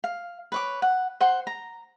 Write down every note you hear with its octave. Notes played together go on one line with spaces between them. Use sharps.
F5
B4 C#5 D6
F#5
C5 F#5 C6
A#5